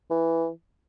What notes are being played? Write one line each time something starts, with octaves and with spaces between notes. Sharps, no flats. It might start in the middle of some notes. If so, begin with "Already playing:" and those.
E3